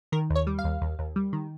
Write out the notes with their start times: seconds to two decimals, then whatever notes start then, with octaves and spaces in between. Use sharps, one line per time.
0.12 D#3 A#4
0.30 D#2
0.36 C#5
0.47 G3
0.59 F5
0.64 D#2
0.81 D#2
0.99 D#2
1.16 G3
1.33 D#3